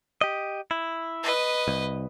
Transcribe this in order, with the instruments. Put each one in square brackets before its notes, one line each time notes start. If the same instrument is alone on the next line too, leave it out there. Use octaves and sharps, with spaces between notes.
[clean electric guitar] G4 D#5
E4
[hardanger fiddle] B4 D#5
[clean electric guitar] C2